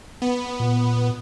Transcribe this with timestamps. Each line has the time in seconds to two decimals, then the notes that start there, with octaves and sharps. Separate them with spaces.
0.22 B3
0.60 A#2